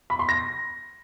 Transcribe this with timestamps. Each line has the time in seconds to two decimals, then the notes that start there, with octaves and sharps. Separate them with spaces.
0.10 B5
0.19 C6
0.29 A#6